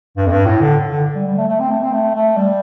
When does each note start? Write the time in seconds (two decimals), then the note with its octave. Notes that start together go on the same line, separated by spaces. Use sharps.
0.17 G2
0.26 F2
0.31 G2
0.46 A2
0.61 D3
0.90 D3
1.15 G3
1.27 G3
1.38 A3
1.48 A3
1.59 C4
1.70 A3
1.82 C4
1.92 A3
2.14 A3
2.37 G3